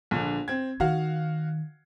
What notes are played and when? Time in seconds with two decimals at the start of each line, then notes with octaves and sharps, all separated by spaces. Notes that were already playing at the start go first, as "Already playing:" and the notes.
0.11 A#1 D3
0.48 C4 G#6
0.80 D#3 F#4 F5 F#5